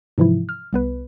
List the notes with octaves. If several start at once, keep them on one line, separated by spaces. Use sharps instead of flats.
G#2 C3 E3 F3 E4
F6
C2 B3 B4